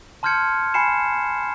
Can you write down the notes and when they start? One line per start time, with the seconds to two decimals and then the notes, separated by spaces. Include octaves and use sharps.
0.23 A5 C6 F6 G6 G#6 C#7
0.74 G#5 B5 C7 C#7 E7